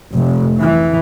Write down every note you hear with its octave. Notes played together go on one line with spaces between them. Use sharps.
F1
E3